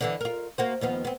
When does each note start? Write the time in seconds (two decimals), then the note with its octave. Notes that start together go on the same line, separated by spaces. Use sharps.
0.01 D3 E3 B3
0.21 F4 A#4
0.58 A#3 F#4 C5
0.81 D#2 F3 B3
1.05 B3 C4